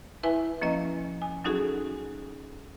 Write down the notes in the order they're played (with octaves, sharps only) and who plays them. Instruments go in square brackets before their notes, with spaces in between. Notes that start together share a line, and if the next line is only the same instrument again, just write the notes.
[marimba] E4 B4 E5 G#5
F3 A#3 C#4 D#5
G#5
F#3 C#4 D#4 F#4 G#4 A4